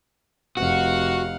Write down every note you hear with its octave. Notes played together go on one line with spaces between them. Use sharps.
F1 D#4 F#4 F5 F#5